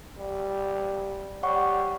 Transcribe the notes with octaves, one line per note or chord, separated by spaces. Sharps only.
G3
G3 C#5 F#5 C#6